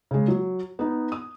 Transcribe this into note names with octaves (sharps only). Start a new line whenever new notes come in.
C#3 G#3
F#3
B3 D#4
D#6